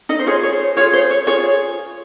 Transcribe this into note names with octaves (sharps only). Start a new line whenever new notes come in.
D#4 D#5
C5
F4 G#4 C#5
C#5
C5
F4 G#4 C#5
C5
C#5
F4 G#4 C#5